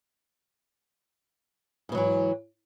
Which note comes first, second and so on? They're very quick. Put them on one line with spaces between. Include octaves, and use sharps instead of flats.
G#2 B2 F#3 E3